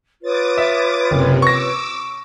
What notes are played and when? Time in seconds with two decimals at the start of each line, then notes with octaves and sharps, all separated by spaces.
0.23 F4 B4 C#5 D6 D#6 A6
0.58 E5
1.11 F#1 C3
1.42 C#6 D6 E6 A#6